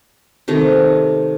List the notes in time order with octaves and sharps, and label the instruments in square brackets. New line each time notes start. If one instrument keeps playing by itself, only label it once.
[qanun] C3 D#3 A3